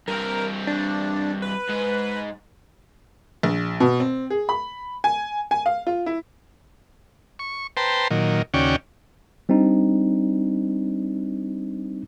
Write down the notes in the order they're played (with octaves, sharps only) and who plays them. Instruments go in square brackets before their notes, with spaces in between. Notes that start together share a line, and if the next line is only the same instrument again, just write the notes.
[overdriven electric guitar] G2 C4 [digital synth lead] A#4
[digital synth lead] D4
B4
[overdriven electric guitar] G#2
[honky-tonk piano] A#1
B2
C4
G#4
B5
G#5
G#5
F5
F4
E4
[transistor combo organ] C#6
B4 C5 G5 A5 A#5 C6
A#2 D#3 F#3
D#2 C#3 C#4 F#4 D5 G5
[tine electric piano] G3 C4 D4 D#4